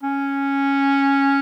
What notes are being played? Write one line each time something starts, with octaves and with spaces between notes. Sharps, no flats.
C#4